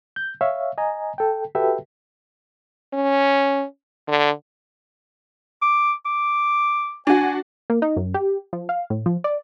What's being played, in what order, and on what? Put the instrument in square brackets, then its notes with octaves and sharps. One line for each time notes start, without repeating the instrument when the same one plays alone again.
[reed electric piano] G6
C#5 E5 F5
D#5 G#5 A#5
A4 G5
F#4 G4 A4 B4 E5 G5
[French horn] C#4
D3
[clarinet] D6
D6
[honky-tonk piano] D4 F#4 [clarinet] G#5
[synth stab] A#3
D#4
F#2
G4
F3
F5
A2
F3
D5